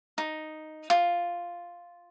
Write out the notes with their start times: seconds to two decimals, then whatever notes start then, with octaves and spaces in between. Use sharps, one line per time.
0.18 D#4
0.90 F4